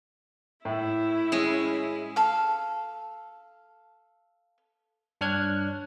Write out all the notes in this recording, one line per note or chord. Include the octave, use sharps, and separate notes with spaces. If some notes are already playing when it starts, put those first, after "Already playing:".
A2 E4
G#3 C#4
A4 F5
G2 D4 C#5 F6 F#6 G#6